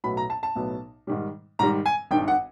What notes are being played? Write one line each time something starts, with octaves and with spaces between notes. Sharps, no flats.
B1 A2 F#3 B3 B5
A#5
A5
A5
B1 A2 F#3 B3
G#2 D#3 G3
G#2 D#3 G3 A#5
G#5
G#1 G2 D#3 G5
F#5